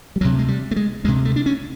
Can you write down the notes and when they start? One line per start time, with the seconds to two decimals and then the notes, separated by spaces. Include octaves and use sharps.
0.16 G3
0.21 D2 F#3
0.25 C3
0.39 G#3
0.48 G3
0.71 A3
0.76 G#3
1.04 D2 G#3
1.08 C3
1.25 A3
1.36 D4
1.46 C#4